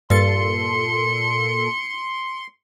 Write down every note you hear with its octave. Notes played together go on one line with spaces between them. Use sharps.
G2 A#2 A4 C6 A6 C#7